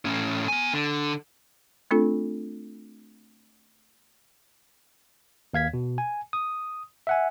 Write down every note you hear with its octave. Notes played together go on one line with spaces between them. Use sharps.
A2 C#4
B3 G#5
D3
A3 C4 D4 F4 A4
D#2 F5 G#6 B6
B2
G#5
D#6
E5 F#5 G#5